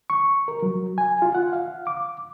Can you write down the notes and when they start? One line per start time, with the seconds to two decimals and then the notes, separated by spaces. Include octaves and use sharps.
0.10 C#6
0.48 A#4
0.62 F#3
0.98 G#5
1.22 F4
1.35 F#5
1.53 F5
1.87 D6